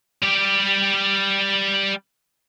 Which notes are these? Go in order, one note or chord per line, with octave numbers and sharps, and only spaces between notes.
G3 G4